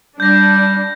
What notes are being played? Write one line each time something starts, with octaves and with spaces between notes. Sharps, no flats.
G3 D4 G6 A#6